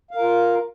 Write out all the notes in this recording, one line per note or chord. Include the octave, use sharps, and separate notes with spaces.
F4 A#4 F5